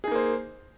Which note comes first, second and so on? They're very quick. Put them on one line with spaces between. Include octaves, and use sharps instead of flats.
G#4 D#4 A#3 C5